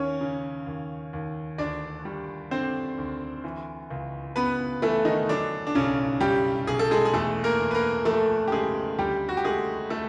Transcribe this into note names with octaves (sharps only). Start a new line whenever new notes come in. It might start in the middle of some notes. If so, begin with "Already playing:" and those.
Already playing: D#2 C#4 C#5
C#3
D#2
D#2
D2 D4 D5
G3
D3 C4 C5
D2
E3
C#2
C#3 B3 B4
E3 A3 A4
D#3 D#4
D3 F#3 D4
D4
B1 C#3 C#4
B1 G3 G4
B1 G#4
A4
G#3 G#4
G#4
E2 A3 A4
A#3 A#4
E2
B4
A#3 A#4
F3 A3 A4
G4
C#3 G#3 G#4
D2 G3 G4
F#4
G4
G#3 A3 G#4
A3 A4